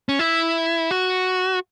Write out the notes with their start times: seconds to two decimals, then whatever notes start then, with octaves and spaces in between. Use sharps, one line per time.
0.09 C#4
0.19 E4
0.91 F#4